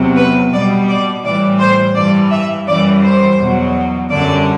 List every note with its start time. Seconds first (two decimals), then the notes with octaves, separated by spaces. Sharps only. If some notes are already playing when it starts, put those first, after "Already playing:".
Already playing: E2 C3 F#3
0.17 B4
0.52 B2 G3 D5
0.88 D5
1.24 A2 E3 G3 D5
1.59 C5
1.95 G2 E3 G3 D5
2.31 E5
2.67 F#2 E3 G3 D5
3.03 C5
3.39 E2 B2 F#3
4.10 F#2 D3 G3 D5